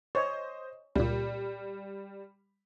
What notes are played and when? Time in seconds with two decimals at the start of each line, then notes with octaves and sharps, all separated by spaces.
0.15 C5 C#5 D#5
0.95 C#2 A#2 G3